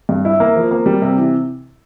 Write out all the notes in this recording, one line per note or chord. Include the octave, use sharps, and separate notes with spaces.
G2
E4
A#3
F3
A#3
G3
C3
E3